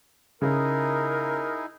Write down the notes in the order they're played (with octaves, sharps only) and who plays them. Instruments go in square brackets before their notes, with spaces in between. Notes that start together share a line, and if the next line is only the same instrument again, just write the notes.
[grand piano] C#3 [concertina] D#4 E4 G#4 [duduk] A#4